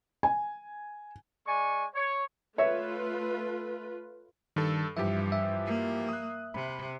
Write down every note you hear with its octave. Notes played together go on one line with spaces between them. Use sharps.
G#5
G#3 D5 G#5 C#6
C#5
A3 F4 B4 C#5 E5
G2 D#3 A4
G2 E3 F3 G4 E5
E5
A#3
D#6 F#6
C3 B5